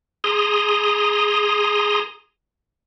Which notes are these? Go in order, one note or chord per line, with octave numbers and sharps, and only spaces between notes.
G#4 A#5 C6 D#6